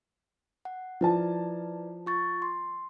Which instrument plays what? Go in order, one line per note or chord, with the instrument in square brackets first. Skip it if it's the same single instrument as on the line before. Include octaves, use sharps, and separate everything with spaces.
[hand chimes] F#5
[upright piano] F3 A5 [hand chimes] E4 B4 D5
[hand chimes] F4 C#6 A6
C6